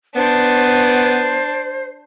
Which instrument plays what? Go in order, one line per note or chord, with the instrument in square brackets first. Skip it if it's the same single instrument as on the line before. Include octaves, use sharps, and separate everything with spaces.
[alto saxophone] B3 [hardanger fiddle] D4 [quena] C5